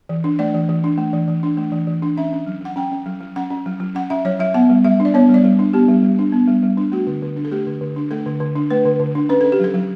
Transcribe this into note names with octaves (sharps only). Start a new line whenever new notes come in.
E3
D4
A3 D5
E3
E3
D4
A3
E3
E3
D4
A3
E3
E3
D4
C#4 E5
C#4
F#3
F#3 F#5
C#4 G5
C#4
F#3
F#3
C#4 F#5
C#4
F#3
F#3
C#4 F#5
C#4 E5
F#3 C#5
F#3 E5
B3 F#5
G3
G3 E5
D4
D5
B3 C#5
G3
D5
G3
D4
B3 G4
G3
G3
D4
B3
G3
G3
D4
A3 F#4
D3
D3
D4
A4
A3 G4
D3
D3
D4
A3 A4
D3
D3
D4
A3 B4
D3
D3
D4
C#4 B4
C#4 A4
G4
F#3 A4
F#3